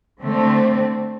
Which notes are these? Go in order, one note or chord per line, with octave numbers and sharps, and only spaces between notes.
D3 A3 C4